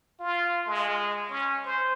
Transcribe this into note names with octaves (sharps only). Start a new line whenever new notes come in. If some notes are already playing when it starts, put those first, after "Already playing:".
F4
G#3
C#4
C5